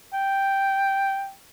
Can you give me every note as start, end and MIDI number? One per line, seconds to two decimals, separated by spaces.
0.13 1.31 79